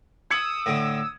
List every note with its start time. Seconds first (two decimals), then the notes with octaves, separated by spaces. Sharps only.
0.31 D#6 E6 G#6 C#7 F#7
0.66 A2 D3